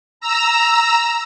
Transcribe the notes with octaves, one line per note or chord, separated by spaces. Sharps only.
A#5 E6